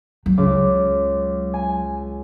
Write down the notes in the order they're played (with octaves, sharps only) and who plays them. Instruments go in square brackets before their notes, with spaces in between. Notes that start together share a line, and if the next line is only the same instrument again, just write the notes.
[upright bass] F#3
[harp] C#2 D6
G#5